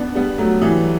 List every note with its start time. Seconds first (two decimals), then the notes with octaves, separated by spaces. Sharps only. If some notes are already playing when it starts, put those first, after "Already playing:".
Already playing: B3 D4
0.15 G3 B3
0.38 F#3 A3
0.62 E3 G3